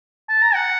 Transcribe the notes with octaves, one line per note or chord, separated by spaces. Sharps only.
A5
A#5
F#5